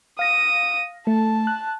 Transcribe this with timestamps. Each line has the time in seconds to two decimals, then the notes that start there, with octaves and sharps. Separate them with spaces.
0.19 F5 D#6 A#6
1.07 A3 A5
1.47 F#6